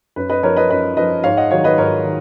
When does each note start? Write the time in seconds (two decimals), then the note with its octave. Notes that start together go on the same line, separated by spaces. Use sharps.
0.16 F#2 B4
0.29 B4 D#5
0.43 F3 A#4 C#5
0.56 B4 D#5
0.70 F#2 B4 D#5
0.97 F3 B4 D#5
1.24 G#2 C#5 F5
1.37 D#5 F#5
1.51 D#3 F#3 C#5 F5
1.64 B4 D#5
1.78 G#2 A#4 C#5
2.04 D#3